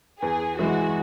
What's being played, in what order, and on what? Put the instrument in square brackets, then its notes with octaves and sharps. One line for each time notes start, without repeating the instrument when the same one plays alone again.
[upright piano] E2 [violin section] G#4
[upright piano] E3 G#3 [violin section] F#4